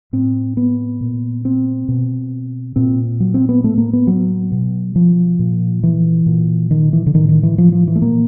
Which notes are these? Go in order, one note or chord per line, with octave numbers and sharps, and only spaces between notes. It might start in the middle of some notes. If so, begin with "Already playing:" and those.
A2 C4
B3
A#2
C4
B2
A#2 C4
F#3
C4
B3
A2 A3
A#3
B3
F#3
B2
F3
A#2
E3
A#2
D#3
E3
D3
A2 D#3
D#3
E3
F3
F3
E3
A3
A#2 A#3